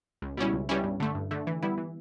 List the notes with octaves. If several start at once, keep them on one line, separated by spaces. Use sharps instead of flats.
C#2
B2 G3 C#4 E4
C#2
B2 G3 C#4 E4
G2
D3 A3
G2
D3 A3
E3
G3 B3 E4
E3